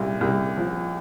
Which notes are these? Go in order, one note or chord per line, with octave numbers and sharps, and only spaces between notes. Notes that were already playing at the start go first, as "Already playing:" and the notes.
Already playing: C2 A#2
C2
F3